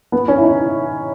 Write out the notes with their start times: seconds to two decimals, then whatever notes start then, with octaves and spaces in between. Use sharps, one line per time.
0.12 B3
0.28 C#4
0.38 E4
0.43 D#4